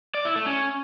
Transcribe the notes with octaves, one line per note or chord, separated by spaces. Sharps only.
D5
E4
A3
C#4